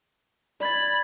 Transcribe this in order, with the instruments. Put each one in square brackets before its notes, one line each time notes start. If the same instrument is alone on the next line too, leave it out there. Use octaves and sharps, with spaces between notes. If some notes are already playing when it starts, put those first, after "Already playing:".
[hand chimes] D5 G#6 A6 [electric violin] B5